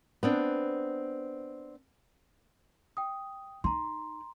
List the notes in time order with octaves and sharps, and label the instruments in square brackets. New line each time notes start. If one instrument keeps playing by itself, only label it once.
[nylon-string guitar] B3 C4 D4
[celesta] G5 D#6
[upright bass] D#4 [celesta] A#5 C6